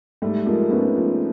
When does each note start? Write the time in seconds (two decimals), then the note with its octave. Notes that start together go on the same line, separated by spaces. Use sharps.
0.22 G#2 G3 A3
0.46 F3 G#3 A#3
0.71 G#2 B3 C#4
0.96 F3